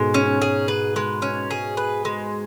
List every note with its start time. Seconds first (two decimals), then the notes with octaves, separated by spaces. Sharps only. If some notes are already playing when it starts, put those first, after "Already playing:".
Already playing: G#2 B2 G#3
0.14 C#4
0.42 G#4
0.68 B4
0.96 G#3
1.22 C#4
1.51 G#4
1.77 B4
2.05 G#3